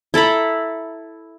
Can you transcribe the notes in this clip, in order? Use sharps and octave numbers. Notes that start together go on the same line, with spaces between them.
E4 A4 A#5 B5